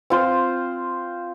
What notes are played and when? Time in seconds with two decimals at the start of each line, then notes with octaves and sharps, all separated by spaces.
0.10 C4 F4 C5